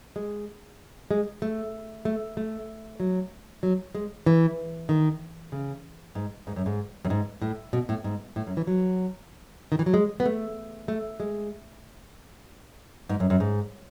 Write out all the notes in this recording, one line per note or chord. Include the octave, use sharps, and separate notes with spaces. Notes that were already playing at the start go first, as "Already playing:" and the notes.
G#3
G#3
A3
A3
A3
F#3
F#3
G#3
E3
D#3
C#3
G#2
G#2
F#2
G#2
F#2
G#2
A2
B2
A2
G#2
A2
F#2
E3
F#3
D#3
E3
F#3
G#3
B3
A3
A3
G#3
G#2
F#2
F#2
G#2